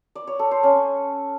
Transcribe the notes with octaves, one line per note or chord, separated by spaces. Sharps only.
D5
C#5
A4
C5
C#4